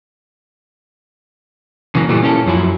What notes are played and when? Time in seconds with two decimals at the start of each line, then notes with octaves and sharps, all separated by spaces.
1.95 C#3 E3 F#3 A#3
2.09 A#2 E3 G3 A3
2.23 A#3 C#4 E4 A4
2.46 F#2 F3 F#3 E4